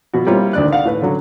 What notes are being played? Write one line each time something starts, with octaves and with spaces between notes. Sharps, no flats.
B2 F3 F#4
G3 A#3 C4 E4 F4 C#5
D2 D#3 D5 F#6
D5 F5 F#5
A2 B4
D3 F#3 C#4